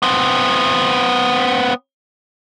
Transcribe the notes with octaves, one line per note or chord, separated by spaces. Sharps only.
B3 C4